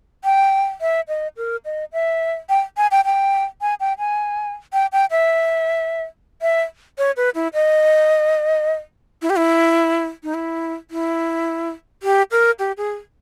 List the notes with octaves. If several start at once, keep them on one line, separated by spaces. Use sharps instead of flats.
G5
E5
D#5
A#4
D#5
E5
G5
G#5
G5
G5
G#5
G5
G#5
G5
G5
E5
E5
C#5
B4
E4
D#5
E4
G4
E4
D#4
E4
E4
G4
A#4
G4
G#4